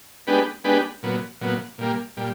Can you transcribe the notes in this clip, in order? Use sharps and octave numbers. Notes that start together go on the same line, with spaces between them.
G#3 B3 D4 G4 B4
G#3 B3 D4 G4 B4
A#2 F#3 B3
A#2 F#3 B3
A#2 G3 A#3
A#2 G3